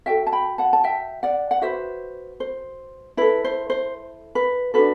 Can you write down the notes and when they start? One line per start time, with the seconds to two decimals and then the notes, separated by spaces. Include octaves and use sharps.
0.06 F#4 A4 E5 G5
0.27 A5
0.32 G5 B5
0.58 F#5 A5
0.73 A5
0.84 E5 G5
1.23 D5 F#5
1.51 F#5
1.62 F#4 B4 C5 E5
2.40 C5
3.17 E4 A4 B4
3.44 C5
3.70 C5
4.35 B4
4.74 D4 F#4 A4 B4